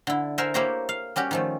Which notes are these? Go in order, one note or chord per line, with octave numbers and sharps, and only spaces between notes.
D3 E4
A#4 C5 E5 F#5 G#5
A#3 E4 G4 C5 C#5 A#5
F5
G3 C#4 F#4 G4
D#3 F3 A3